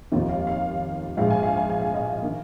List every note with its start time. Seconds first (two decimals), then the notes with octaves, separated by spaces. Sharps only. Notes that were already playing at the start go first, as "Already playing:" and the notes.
0.12 F1 D#2 D#3 A#3 F4
0.29 F5
0.47 F5
1.17 A#1 G#2 G#3 F5
1.30 G#5
1.43 F5
1.57 G#5
1.70 G#5
1.81 F5
1.94 D#5
2.05 F5
2.22 D#3 A#3